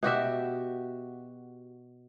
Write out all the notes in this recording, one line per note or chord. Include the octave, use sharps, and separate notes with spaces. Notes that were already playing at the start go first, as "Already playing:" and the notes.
B2 F#4 G4 E5